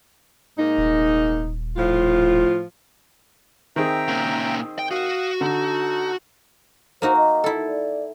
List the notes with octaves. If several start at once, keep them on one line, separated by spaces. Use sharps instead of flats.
G#2 A#3 D#4
D#1
A2 F3 F4
D#3 C4 G#4 E5 G5 A#5
A#2 C#3
G5
F#4 F5 D#6
D3 D#4 A4
A#3 D#4 F#4 C5
D#5
E4 A4
D5